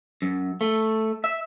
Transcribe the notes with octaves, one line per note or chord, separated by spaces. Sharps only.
F#2
A3
E5